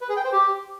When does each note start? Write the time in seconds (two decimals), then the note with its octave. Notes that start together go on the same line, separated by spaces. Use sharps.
0.01 B4
0.09 G#4
0.17 G5
0.25 C5
0.32 G4